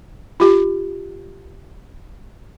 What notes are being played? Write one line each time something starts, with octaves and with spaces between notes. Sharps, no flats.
F4 G4